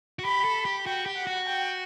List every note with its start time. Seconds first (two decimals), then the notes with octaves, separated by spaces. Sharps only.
0.19 F#4
0.25 G4 B5
0.45 A4
0.65 G4
0.85 F#4 G5
1.06 G4
1.16 F#5
1.27 F#4
1.46 G5